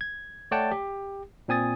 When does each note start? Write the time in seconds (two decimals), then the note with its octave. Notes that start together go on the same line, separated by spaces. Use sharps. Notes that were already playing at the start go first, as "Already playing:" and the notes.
0.01 G#6
0.51 A3 C#5 D5 F#5 G5 A5
0.71 G4
1.48 A#2 C4 G#5 D#6 A6